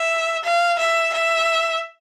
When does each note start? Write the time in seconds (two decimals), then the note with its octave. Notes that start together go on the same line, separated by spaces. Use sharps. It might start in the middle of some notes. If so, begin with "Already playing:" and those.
Already playing: E5
0.44 F5
0.79 E5
1.14 E5